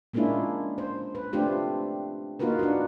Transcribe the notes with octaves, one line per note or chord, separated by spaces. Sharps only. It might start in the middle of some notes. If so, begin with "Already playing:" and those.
G#3 A#3 C#4 D4 E4 F4
C5
B4
A3 C4 D4 F4 G4 C5
A#3 D#4 F4 F#4 A#4 B4
D4 F#4